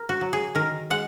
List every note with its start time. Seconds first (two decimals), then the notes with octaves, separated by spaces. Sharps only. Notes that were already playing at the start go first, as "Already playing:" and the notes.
Already playing: A#4
0.09 F#4
0.21 F#3
0.33 G#4
0.55 D#3 A#4
0.90 G#3 F#5